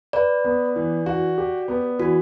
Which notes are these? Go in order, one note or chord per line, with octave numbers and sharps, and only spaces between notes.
B4 D5
B3
E3
F#4
G4
B3
E3 F#4